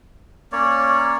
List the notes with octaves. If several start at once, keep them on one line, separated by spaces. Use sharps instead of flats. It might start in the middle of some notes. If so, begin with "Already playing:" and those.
A#3 C#4 C#5 D5